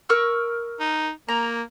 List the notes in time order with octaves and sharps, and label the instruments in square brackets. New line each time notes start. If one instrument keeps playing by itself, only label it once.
[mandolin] A#4 C#6 E6
[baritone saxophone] D#4
[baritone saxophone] A#3 [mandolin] A#5